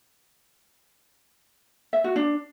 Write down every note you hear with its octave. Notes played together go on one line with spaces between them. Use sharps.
E5
F#4
D4